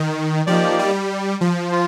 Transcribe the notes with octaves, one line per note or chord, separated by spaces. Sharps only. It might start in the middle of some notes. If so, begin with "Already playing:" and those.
Already playing: D#3
F3 A#3 D#4 G4 D5
G3
F3
F4